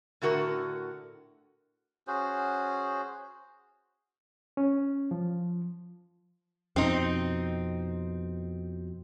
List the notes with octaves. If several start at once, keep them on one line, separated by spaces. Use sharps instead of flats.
A2 D3 F#4 A#4
C#4 F#4 G#4 C5
C#4
F3
F2 B2 C4 D#4